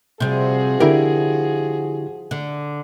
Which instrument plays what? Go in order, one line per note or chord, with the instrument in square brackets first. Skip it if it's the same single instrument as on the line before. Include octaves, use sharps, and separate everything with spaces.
[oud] C3 G3 [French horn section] F3 F#4 G#4
[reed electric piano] D3 E4 G4 [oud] A#4
[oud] D3